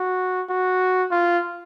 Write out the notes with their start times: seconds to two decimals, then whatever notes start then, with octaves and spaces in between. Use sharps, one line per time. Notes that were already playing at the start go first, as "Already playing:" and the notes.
Already playing: F#4
0.50 F#4
1.11 F4